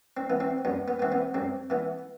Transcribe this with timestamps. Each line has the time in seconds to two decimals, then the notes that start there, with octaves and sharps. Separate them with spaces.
0.17 C4
0.30 E3 B3
0.40 C4
0.65 F#2 B3
0.88 B3
0.99 E3 B3 C4
1.12 B3
1.34 F#2 C4
1.70 E3 B3